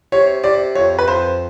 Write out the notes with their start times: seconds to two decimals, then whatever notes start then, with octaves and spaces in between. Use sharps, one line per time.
0.12 C3 C#5
0.44 C3 D5
0.75 F2 C#5
0.99 B4
1.08 F2 C5